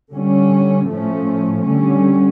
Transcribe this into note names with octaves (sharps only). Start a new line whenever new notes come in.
D3 G3 C#4
A2 F3 A3 C#4
D3 G3 C#4